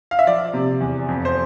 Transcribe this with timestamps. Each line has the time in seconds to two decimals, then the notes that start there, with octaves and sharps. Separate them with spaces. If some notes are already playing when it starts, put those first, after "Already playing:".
0.11 F5
0.19 E5
0.27 F3 D5
0.54 C3
0.81 E2
1.08 F2
1.25 C5